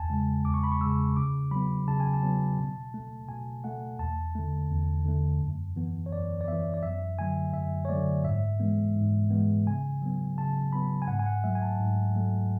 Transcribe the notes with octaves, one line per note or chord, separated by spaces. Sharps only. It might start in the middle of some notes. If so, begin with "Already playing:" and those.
Already playing: E2 G#5 A5
C#3 G#3
E2 D6
C#6
B5
C#6
C#3 G#3 E6
C#3 D6
F#3 B3 B5
C#3 A5
G#5
A5
F#3 B3
B2
A3
B2 G#5
A3 F#5
E2 A5
D3 A3
E2
D3 A3
F#2
E3 B3
C#5
F#2 D5
D5
E3 B3 E5
D5
F#2 E5
D3 F#3 A3 G#5
F#2 E5
C#5
D3 F#3 A3 D5
G#2 E5
E3 G#3 B3
G#2
E3 G#3 B3
C#3 G#5
F#3 B3
C#3 A5
F#3 B3 B5
G#5
G#2 F#5
G#5
F#5
F#3 A3 E5
G#5
A5
G#2
F#3 A3